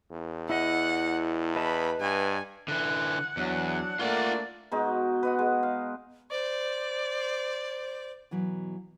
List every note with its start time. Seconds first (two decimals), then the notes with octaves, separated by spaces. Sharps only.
0.11 E2
0.50 E4 D#5 F#5
1.56 B4 D#5 A5 B5
2.00 G2 G#5
2.68 D3 E3 F#5
3.37 E2 F#3 D4
3.99 A3 A#3 D4 F4 D5 F#5
4.72 B2 G#3 D#4
5.23 B4 D#5 F#5
5.39 G#3
5.63 F5
6.31 C5 D5
8.31 B2 E3 F#3